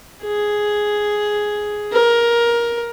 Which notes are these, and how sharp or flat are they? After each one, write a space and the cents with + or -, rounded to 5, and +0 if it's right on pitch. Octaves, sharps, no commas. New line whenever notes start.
G#4 +5
A#4 +15